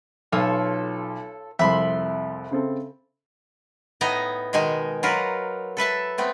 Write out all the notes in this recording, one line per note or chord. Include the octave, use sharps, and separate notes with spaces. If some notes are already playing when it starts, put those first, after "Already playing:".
B1 F4 A4 C#5
C2 F2 E5 B5 C6
C#3 C4 A4
A2 B3 D#4 D#5 G#5 A#5
B2 D#3 G#3 D#4 G#5
F#3 F4 A#4 B4
A4 B4 E5 A5
A3 B3 C4